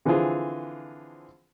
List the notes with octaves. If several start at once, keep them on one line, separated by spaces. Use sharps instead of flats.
D3 E3 F3 C4 F4 G#4